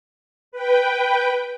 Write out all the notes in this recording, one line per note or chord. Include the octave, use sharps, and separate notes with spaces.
B4 G5